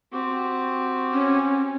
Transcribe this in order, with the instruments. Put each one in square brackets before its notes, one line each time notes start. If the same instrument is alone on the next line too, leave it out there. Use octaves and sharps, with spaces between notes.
[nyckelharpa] C4 [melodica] F#4 G4
[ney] C#4